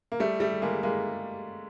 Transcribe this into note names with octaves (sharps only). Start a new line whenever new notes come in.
A#3
G3 A3
G3 A3
G#3 A#3
G#3 A#3